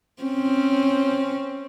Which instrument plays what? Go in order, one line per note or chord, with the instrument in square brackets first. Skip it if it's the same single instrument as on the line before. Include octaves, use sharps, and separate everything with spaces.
[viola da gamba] C4 C#4